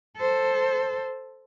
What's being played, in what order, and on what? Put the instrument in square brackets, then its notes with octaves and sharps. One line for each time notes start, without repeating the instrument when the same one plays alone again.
[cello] A4 C5